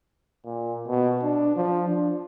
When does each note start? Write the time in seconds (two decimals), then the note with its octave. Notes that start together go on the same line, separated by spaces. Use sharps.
0.45 A#2
0.87 B2
1.23 D4
1.56 F3
1.88 D4